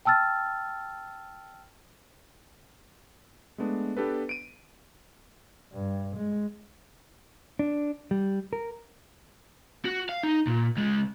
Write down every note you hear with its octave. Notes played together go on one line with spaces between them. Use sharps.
G5 A5 E6 F6 A6
G#3 A3 B3 D4
B3 D4 G4 A4 B4
D7 D#7
G2
G#3
D4
G3
A#4
F#4
F5
D#4
A#2
C#2 G#3